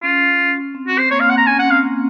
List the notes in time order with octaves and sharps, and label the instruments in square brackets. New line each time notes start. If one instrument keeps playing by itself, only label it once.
[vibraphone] C#4 [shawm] F4
[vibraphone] C4
[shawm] F#4
[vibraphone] C4
[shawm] C5
[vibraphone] A#3 [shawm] C#5
[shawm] F5
[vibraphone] C4
[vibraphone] A#3 [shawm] F#5
[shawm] A#5
[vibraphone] C#4 [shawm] G#5
[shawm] F#5
[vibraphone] C4
[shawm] F5
[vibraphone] A#3